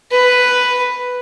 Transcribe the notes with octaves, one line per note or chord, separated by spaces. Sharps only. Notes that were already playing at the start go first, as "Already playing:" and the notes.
B4